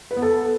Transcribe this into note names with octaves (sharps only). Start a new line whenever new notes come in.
B4
B3
A4